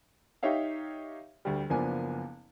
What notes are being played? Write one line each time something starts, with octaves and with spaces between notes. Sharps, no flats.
D#4 G4 C#5 E5 F5
D2 G3
F#1 F3 A#3 B3 D4 G#5